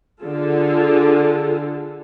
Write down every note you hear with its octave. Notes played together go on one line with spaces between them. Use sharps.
D3 F4 G#4 A4